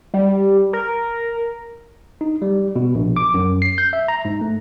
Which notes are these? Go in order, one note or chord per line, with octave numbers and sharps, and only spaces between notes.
G3
A#4
D#4
G3
B2
A#1
D6
F#2
C7
G6
E5
A#5
G#2
A3